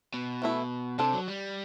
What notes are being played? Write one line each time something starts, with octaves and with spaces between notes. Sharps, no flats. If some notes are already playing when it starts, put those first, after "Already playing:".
B2
E3 A3 E4
C3 D4 A4 C5
F#3
G3